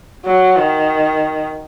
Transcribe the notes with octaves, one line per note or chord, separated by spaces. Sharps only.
F#3
D#3